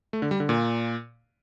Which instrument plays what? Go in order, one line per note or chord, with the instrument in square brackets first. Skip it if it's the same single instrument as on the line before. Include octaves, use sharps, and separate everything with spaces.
[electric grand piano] A3
D3
G3
D3
A#2